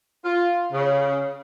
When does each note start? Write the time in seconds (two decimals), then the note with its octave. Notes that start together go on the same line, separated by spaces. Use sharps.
0.24 F4
0.73 C#3